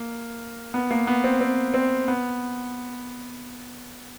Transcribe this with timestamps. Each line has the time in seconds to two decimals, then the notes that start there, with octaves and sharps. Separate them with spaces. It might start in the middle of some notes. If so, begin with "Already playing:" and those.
Already playing: A#3
0.74 B3
0.91 A#3
1.07 B3
1.24 C4
1.41 C4
1.74 C4
2.08 B3